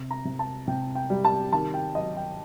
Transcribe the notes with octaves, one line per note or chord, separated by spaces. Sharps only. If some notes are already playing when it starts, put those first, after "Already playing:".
Already playing: C3
A#5
C3
A5
C3 G5
G5
G3
A5
D#3 A5
G5
F#3 D#5
G5